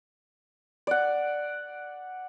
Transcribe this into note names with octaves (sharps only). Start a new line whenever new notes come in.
D5 F#5